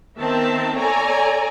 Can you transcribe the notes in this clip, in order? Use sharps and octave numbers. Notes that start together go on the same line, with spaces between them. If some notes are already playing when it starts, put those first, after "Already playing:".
D#3 B3 C4 E5 A5
A4 C#5 D5 G#5 A#5